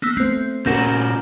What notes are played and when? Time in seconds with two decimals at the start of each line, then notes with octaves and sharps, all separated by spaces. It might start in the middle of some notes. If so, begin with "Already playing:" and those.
0.02 A#3 B3 E6
0.17 A3 C4 C5
0.66 A#2 C#4 F#4 A#4 G6 A#6 E7